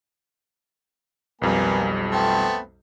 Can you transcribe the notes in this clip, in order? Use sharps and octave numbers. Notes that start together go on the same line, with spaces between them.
B1 F2 G3 A#3 B4 G#5
A3 B3 C4